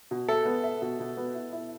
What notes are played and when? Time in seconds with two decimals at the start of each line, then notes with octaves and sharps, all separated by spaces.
0.11 B2
0.29 A4 E5
0.45 B3
0.64 E5
0.82 B2
1.00 B2
1.17 B3
1.35 E4
1.53 E4